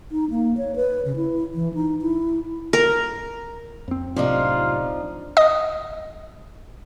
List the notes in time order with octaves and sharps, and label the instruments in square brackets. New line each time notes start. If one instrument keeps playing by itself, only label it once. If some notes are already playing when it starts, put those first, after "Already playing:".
[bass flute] D#4
A#3
C#5
B4
C#3
E4
E3
D#4
E4
[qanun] A#4
[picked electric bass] F2 C4
[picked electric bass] B1 A2 C3 [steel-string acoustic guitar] F3 D4 D#4 [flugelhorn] F4
[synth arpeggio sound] D#5 D#6